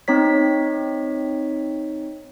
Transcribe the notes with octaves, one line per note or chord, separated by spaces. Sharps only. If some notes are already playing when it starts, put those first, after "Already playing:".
C4 D#4 C#5 B6